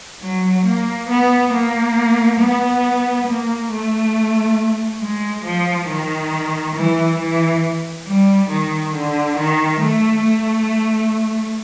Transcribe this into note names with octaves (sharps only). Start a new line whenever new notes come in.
F#3
A#3
B3
A#3
B3
A#3
A3
G#3
F3
D#3
E3
E3
G3
D#3
D3
D#3
A3
A3